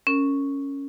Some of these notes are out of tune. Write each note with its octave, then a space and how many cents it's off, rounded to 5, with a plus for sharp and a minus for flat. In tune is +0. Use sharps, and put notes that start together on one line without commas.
C#4 +0 A#4 -25